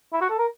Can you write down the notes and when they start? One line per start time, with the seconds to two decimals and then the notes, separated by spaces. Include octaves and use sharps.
0.13 E4
0.21 F#4
0.29 A4
0.39 A#4